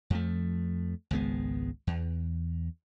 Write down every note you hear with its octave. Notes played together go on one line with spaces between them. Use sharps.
F2 F3 A3
G#1 C#2 G#3 B3
E2